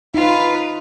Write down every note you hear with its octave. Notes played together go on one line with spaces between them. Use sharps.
D#4 F4 B4